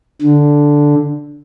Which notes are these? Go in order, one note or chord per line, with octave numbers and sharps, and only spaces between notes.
D3